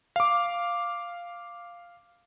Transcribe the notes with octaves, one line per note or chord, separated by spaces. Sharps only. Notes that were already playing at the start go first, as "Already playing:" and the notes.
F5 D6